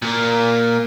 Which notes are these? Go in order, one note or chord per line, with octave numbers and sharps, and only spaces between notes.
A#2 A#3